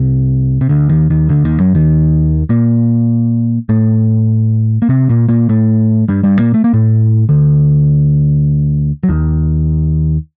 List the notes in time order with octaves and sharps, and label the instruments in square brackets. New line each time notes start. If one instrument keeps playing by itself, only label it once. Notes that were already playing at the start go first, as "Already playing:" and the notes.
Already playing: [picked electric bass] C2 C3
C3
D2 D3
D#2 D#3
D#2 D#3
D2 D3
D#2 D#3
F#2 F#3
D#2 D#3
A#2 A#3
A2 A3
A#3
C3 C4
A#2 A#3
A#2 A#3
A2 A3
G2 G3
G2 G3
A#2 A#3
A3
A#3
A2 A3
D2 D3
F#3
D#2 D#3